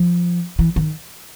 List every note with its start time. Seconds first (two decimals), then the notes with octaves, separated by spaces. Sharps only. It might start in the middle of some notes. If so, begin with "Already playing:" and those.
Already playing: F3
0.59 E3
0.76 D#3